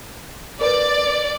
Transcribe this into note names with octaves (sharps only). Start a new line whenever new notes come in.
A#4 B4 D5